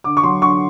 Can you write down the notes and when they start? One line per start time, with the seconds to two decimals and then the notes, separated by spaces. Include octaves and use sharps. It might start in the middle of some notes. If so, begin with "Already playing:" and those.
0.04 D3 D6
0.17 C#6
0.24 F#3 C6
0.42 D3 C#6